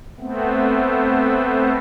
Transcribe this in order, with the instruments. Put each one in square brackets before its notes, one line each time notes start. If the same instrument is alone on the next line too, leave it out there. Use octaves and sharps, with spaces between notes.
[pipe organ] A3 B3 C4